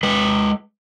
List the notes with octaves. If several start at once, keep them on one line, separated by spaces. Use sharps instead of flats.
G#3 B4